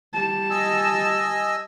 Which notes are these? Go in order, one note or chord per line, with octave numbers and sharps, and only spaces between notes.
G3 A5
D#5 G#5 E6